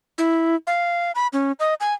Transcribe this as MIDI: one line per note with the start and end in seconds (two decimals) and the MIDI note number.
0.18 0.55 64
0.67 1.12 77
1.15 1.27 83
1.33 1.52 61
1.60 1.74 75
1.80 1.94 80